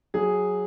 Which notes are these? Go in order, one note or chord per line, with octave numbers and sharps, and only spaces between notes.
F#3 G#4